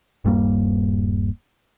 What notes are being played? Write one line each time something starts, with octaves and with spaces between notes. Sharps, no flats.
D#1 G2 G3 A#3